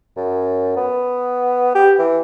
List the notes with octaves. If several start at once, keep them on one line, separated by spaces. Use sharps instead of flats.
F#2
B3
G4
E3